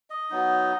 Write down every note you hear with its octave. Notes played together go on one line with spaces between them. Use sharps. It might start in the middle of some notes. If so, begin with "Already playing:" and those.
D#5
F#3 B3 D#4